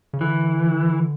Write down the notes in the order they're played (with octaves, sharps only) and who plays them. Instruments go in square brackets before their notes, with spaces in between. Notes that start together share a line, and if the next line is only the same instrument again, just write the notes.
[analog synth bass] C#3
[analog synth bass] D3 [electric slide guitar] E3